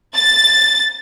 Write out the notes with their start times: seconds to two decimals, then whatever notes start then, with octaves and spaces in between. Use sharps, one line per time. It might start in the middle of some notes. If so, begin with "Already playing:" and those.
0.14 A6